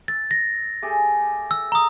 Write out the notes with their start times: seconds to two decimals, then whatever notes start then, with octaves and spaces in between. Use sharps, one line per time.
0.08 E6 A6
0.31 A#6
0.82 A3 G4 G#4
1.51 E6
1.72 A#5 D#6